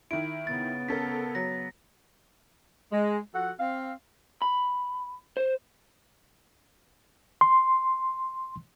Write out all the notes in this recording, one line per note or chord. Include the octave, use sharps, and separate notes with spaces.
D#3 E4 D7
C#3 B3 A6
C#4 A4 A#4 B6
F#3 A#6
G#3
F3 F#4 A4 F#5
C4 F5
B5
C5
C6